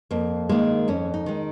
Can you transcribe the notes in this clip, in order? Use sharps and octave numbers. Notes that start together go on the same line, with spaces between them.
F2 A#3
D#3 G#3 A#3
F2 C#4
D#4
D#3 G#3